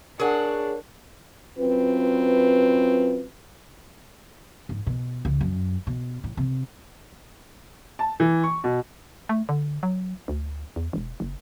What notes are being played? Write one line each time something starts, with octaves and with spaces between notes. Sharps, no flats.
D4 G#4 A#4 C#5 F#5
F#2 C4 F4 B4
G#2
B2
C#2
F#2
B2
A2
C3
A5
E3
C#6
B2
A3
D3
F#3
D2
E2
E1
F#1